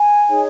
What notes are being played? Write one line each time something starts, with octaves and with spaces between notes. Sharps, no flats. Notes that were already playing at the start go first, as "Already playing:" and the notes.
Already playing: G#5
D#4 G#4 C#5